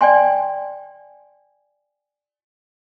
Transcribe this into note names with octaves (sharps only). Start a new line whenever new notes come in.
D5 G5 G#5 C6